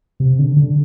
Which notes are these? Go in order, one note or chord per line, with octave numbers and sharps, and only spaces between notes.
C3
D3
D3